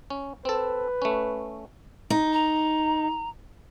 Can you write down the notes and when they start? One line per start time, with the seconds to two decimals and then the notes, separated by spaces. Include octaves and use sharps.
0.10 C#4
0.45 C4 A4 B4
1.02 A3 C#4
2.10 D#4
2.33 A#5